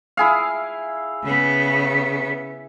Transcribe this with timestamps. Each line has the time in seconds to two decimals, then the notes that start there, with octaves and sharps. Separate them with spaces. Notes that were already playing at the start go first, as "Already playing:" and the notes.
0.17 E4 G#4 F5
1.24 C#3 B3